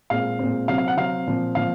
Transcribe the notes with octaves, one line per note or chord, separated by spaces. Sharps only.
A#2 G#3 C4 F5
A#2 G#3 C4
C3 F#3 C4 F5
F5
F#5
C3 F#3 C4 F5
A#2 F3 C4
A#2 F3 C4 F5